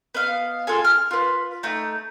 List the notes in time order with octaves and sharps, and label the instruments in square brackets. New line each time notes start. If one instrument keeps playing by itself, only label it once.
[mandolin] B3 D#5 F5
F4 G#4 A4 G#5
F6
F4 B4
A3 D#4